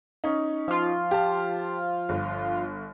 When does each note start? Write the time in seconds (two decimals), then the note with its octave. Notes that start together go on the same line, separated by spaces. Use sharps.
0.24 C#4 D#4
0.68 F3 F4
1.11 G4 A5
2.09 G1